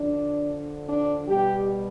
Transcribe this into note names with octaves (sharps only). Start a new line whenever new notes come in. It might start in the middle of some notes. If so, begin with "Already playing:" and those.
Already playing: D3 F3 D4
D4
B2 G3 G4